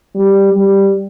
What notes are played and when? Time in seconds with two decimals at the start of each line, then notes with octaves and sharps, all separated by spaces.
0.15 G3
0.52 G3